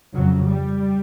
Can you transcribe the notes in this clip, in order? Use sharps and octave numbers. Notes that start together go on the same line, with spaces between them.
F2 C#3 F#3
G3